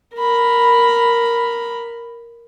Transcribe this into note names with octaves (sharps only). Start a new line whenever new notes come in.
A#4 B5